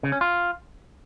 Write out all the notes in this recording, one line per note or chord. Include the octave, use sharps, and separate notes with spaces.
C#3
C#4
F4